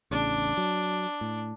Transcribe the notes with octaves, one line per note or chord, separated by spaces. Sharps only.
A1 E2 C#3 D4
F#3
A2